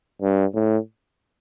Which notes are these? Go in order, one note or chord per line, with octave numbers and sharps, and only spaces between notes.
G2
A2